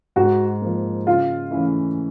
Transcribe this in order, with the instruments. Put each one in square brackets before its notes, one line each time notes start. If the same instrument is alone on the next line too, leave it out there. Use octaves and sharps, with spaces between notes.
[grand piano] G#2 [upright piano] F#4
[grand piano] F3 A#3
[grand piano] C#3 [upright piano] F4
[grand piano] E3 A3 C#4 E4